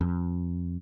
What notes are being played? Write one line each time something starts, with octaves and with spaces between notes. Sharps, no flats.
F2